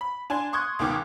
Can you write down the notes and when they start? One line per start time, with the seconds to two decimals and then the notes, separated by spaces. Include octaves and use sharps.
0.01 B5
0.30 D4 G#5 C6
0.53 C6 C#6 D#6 F#6 G#6
0.79 C#2 B2 D#3 G5 D6 F6